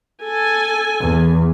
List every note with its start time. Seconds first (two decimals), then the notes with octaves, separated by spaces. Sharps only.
0.23 A4 G#5
1.00 E2